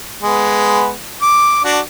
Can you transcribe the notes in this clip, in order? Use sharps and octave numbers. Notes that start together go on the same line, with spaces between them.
G#3 B3
D6
D4 F#4